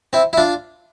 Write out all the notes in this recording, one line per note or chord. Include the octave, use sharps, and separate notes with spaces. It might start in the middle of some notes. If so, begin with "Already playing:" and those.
C4 E4
E4
D4 F4